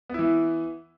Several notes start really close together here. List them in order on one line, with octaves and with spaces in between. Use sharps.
B3 E4 E3